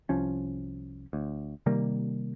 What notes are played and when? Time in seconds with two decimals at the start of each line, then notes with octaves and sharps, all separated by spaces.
0.09 C2 F3 C#4
1.13 D2
1.66 C3 D#3 G3 A#3